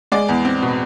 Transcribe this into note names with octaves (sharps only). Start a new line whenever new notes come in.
G#3 D5
E2
C4
B2